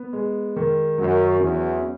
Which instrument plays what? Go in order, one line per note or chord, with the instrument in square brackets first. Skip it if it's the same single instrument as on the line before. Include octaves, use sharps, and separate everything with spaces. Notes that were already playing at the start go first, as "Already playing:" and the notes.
Already playing: [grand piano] B3
G#3
D#3
[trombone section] F#2 [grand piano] F#3
[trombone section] E2 [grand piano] C#4
[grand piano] C#4